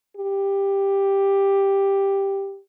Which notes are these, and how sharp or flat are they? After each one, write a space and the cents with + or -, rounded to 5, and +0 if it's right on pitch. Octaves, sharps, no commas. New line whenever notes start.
G4 +5